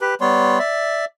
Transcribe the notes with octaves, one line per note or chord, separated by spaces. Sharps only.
G4 B4
G3 B3 C#5 C6
D5 E5